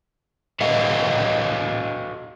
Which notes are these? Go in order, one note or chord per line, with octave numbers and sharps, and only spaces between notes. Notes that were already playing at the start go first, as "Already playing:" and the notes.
F#4 A4 B4 D#5 F5 F#5